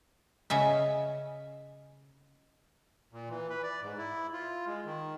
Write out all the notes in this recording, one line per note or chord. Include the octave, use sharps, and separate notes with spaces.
C#3 C#4 D#5 E5
A#2
E3
B4
D5
G#2
E4
F4
G#3
D#3